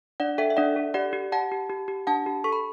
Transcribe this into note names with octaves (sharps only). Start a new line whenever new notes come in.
D4 D5 F#5
A4 E5 G5
E5
D4 D5 F#5
A4
G4 D5 F#5
G4
G4 F#5 A5
G4
G4
G4
D4 F#5 A5
G4
A4 C#6
B5